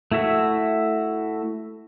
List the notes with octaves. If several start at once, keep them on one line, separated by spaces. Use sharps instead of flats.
A3 E4 F#4 E5